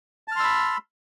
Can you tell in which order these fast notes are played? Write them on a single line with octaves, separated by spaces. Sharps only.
A5 F6 C6 E6 B5